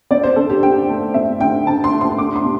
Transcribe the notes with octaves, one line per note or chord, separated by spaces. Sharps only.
C4 D5
C5
D3 A4
G4
D3 G5
A3
C4 E5
D3 G5
D3 A5
C6
A3
C6
D4 D6
C6
C3